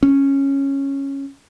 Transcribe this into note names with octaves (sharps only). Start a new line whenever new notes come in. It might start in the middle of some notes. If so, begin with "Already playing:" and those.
C#4